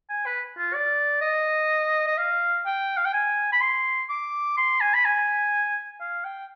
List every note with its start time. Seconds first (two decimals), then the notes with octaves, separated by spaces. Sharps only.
0.10 G#5
0.26 B4
0.58 F4
0.74 D5
1.21 D#5
2.07 D#5
2.18 F5
2.66 G5
2.97 F5
3.05 G5
3.13 G#5
3.53 B5
3.61 C6
4.10 D6
4.57 C6
4.81 G#5
4.94 B5
5.05 G#5
6.01 F5
6.25 G5